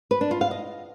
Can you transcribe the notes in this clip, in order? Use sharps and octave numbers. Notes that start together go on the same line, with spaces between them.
B4
D4
F4
F5
D#5